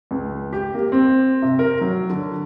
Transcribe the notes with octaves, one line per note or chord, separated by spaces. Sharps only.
C#2
G4
A#3
C4
C3
A#4
F#3
D3